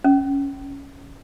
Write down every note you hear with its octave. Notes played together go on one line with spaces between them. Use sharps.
C#4